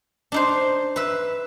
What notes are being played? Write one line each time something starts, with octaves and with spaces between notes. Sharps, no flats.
D4 D#4 C5
B4 E5